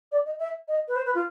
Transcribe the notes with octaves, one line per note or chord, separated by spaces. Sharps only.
D5
D#5
E5
D#5
B4
C5
B4
F4